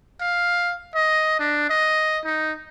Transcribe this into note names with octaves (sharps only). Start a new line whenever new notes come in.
F5
D#5
D4
D#5
D#4